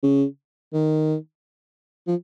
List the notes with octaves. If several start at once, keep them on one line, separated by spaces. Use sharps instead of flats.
C#3
D#3
F3